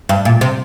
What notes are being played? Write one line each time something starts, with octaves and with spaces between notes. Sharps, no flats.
G2
A#2
C3